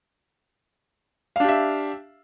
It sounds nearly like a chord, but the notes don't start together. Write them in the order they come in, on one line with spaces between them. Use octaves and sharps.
F5 D4 G4 E5